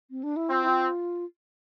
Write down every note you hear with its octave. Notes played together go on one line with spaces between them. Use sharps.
C4
D4
E4
C4 F4
E4
F4